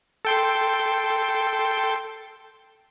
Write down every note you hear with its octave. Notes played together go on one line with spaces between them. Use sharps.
A4 G5 C6